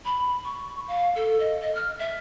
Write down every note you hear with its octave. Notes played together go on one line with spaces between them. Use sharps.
B5
C#6
F5
A4
D#5
D#5
F6
E5